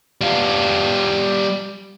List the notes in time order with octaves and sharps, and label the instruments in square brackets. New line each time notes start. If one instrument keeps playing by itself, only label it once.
[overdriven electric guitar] G3 F4